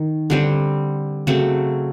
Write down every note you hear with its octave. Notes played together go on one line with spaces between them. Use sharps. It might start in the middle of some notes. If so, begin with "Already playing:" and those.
Already playing: D#3
D3 G3 C4
C#3 F#3 A3 C4